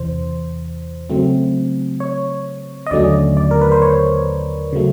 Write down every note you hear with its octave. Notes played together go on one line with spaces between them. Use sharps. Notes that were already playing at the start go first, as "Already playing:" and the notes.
Already playing: E2 C3 E3 C5
C#3 F#3 A3 C4
C#5
D#5
D#2 D3 F#3 A3 C#4 D5
D5
A#4
B4
C5
C#5
C#3 F#3 A3